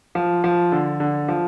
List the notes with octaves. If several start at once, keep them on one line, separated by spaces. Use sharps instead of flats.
F3
F3
D3
D3
F3